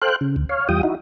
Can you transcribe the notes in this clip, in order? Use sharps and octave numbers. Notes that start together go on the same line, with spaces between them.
A4 C5 F5 G5 F#6
C#3
D2
C#5 F5
E2 G3 F4 G5 D#6
D#4 E4 F#4